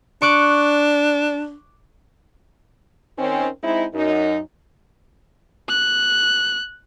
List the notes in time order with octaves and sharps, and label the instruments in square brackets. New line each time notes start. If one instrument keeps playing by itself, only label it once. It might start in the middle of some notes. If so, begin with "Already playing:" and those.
[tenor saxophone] D4 [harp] C#6 D6 F#6
[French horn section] D#3 C4 C#4
G#3 C4 D#4 E4
F#2 D#4
[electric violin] F#6